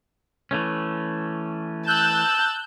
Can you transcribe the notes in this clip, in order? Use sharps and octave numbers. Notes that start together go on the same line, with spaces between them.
E3 A3 C#4
A5 E6 F#6 G6